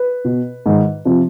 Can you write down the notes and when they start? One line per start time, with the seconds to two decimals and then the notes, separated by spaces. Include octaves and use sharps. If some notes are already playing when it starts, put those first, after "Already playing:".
Already playing: B4
0.25 B2
0.66 G#2 D#3
1.05 C3 F3